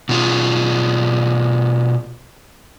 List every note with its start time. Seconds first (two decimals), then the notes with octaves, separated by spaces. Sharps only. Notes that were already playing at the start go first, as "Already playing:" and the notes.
0.09 B2 F4 G#4